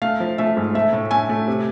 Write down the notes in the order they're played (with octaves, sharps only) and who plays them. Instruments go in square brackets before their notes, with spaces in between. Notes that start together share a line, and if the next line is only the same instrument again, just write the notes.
[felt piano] A3 F5
F3
A3 E5
G#2
A3 E5
A2
A3 G#5
A3
C3